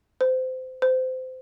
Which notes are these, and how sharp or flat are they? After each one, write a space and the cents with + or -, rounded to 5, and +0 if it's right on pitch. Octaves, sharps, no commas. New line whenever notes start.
C5 -25
C5 -25